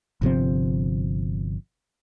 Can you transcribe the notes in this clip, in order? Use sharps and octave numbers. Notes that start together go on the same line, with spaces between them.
G1 C3 F3 C4